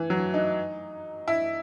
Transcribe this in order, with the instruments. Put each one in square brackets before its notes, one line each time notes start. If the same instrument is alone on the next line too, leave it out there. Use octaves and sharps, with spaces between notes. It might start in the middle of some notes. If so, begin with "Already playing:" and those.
Already playing: [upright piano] E3
F#3
D#4
E4